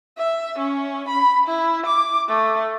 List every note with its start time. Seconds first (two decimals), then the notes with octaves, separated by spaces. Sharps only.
0.18 E5
0.59 C#4
1.08 B5
1.47 E4
1.86 D6
2.28 A3